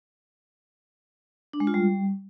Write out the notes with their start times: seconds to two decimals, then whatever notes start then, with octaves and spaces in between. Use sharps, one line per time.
1.53 D4
1.60 G#3
1.67 F4
1.74 G3